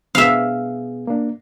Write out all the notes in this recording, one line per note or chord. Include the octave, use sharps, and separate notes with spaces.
B2 B3 G#4 E5 F5
A#3 D4